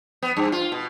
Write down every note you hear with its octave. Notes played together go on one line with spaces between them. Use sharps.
B3
G2
F4
B2